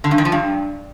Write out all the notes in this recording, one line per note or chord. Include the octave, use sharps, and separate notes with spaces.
D3
G2
D#3
F3
G2